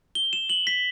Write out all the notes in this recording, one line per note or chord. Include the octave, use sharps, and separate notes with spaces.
G7
E7
F#7
B6